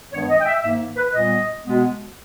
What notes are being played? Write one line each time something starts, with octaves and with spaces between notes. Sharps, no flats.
G2 D#3 G#3 B3 C#5
D#5
G5
E5
G#2 D#3 A#3 E5
B4
A#2 G3 B3 D#5
B2 G#3 B3